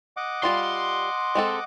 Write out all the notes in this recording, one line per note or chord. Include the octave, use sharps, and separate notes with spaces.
D#5 F#5 D6
G3 F4 F5 C6
G#3 C4 A4